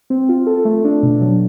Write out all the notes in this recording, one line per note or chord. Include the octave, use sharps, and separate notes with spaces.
C4
F4
A4
A3
D4
B2
F#3